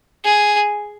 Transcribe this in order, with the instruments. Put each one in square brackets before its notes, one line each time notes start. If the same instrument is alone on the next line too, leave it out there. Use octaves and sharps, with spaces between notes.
[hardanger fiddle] G#4